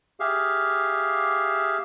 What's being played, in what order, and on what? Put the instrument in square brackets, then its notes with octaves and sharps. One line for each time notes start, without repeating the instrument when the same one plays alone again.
[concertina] G4 G#4 E5 F5